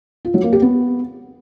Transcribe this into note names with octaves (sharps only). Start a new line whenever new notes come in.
F4
F#3
A#3
G4
B3